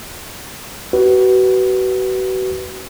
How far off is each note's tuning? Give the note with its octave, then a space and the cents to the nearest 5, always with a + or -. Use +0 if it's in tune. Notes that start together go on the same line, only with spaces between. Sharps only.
F#4 +35 B4 +0